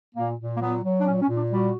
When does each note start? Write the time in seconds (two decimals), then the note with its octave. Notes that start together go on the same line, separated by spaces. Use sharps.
0.15 A#2 A#3
0.39 A#2
0.56 A#3
0.60 F#3 B3
0.84 F#3
0.99 D4
1.06 A#2 C#4
1.21 C#4
1.28 A#2
1.36 D4
1.51 G3 F#4